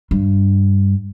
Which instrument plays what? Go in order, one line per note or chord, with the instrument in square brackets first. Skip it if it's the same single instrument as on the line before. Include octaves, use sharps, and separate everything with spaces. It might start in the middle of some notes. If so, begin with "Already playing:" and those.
[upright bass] G2